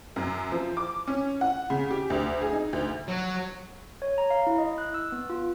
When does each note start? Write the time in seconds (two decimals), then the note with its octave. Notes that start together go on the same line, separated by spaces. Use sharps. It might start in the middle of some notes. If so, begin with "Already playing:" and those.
0.16 F#2
0.52 F3
0.77 D6
1.08 C#4
1.41 F#5
1.70 C#3
1.91 G4
2.10 D2
2.41 G#4
2.53 D#4
2.73 D2
3.08 F#3
4.02 C#5
4.18 A#5
4.31 F5
4.47 E4
4.58 D#5
4.78 F#6
4.94 E6
5.12 B3
5.30 F4